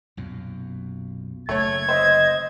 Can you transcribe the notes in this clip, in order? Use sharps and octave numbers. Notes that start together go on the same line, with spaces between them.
B1 F#2 A#2
F#1 D3 A3 C#5 G#6
C5 D#5 E5